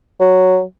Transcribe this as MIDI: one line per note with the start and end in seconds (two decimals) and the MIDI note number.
0.20 0.62 54